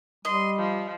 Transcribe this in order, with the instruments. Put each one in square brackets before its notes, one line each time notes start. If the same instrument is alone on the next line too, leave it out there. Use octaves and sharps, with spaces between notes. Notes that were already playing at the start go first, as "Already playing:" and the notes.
[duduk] G3 [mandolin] D#5 [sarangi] C6
[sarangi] F3